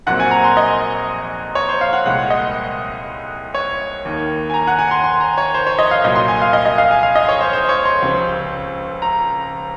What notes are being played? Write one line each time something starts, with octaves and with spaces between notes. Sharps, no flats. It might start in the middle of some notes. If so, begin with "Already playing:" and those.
A#1 A#2 F#3 C4 F#5
G#5
A#5
C6
D#5
C#5
C5
F5
F#5
C2 A#2 G#3 F#5
D#5
C#5
D#2 D#3 A#3
G#5
A#5
F#5
G#5
C6
C6
A#5
C#5
C5
C#5
D#5
F5
C2 A#2 F#3 D#5
C6
G#5
F5
D#5
D#5
F5
G#5
F5
D#5
C#5
C5
C5
C#5
C6
C#2 C3 F3 C4
A#5